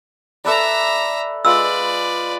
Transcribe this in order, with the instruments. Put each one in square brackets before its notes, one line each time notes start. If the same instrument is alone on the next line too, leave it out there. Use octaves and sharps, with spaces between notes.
[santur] A4 B4 D5 [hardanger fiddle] E5 A#5
[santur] G#3 F4 [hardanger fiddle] B4 D5 [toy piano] E6